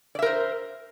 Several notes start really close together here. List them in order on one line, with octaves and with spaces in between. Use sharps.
D5 E5 A#4 C5